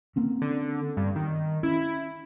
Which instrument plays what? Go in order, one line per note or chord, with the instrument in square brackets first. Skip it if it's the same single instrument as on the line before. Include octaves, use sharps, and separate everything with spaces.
[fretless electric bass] A#3 C4 C#4
[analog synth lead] D3
G2
D#3
[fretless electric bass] C#4 [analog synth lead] E4